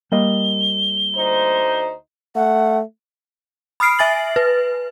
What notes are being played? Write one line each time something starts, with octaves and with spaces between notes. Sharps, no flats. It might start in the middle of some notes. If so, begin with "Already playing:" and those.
G3 A#3 D#5 G7
D2 D#4 C5
A3 F#5
B5 D#6 F6 C7 D7
E5 G#5 A6 F#7
B4